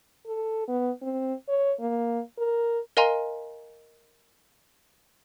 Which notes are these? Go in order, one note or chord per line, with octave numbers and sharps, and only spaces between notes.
A4
B3
C4
C#5
A#3
A#4
A#4 D#5 F5 G#5 A#5 C6